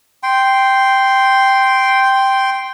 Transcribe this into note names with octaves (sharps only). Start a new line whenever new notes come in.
G5 C6